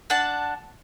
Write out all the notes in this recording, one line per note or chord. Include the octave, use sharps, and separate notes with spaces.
D4 F#5 A5